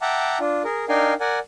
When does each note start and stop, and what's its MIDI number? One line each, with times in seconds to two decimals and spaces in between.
0.02 0.38 76
0.02 0.38 78
0.02 0.38 79
0.02 0.38 81
0.02 0.38 82
0.02 0.38 86
0.40 0.63 62
0.40 0.63 65
0.64 0.85 68
0.64 0.85 70
0.89 1.14 62
0.89 1.14 63
0.89 1.14 70
0.89 1.14 77
0.89 1.14 79
0.89 1.14 80
1.20 1.39 70
1.20 1.39 74
1.20 1.39 78
1.20 1.39 80